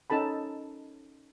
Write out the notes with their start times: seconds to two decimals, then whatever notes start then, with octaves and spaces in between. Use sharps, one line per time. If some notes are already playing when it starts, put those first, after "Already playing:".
0.10 C#4 D#4 A4 A5 B5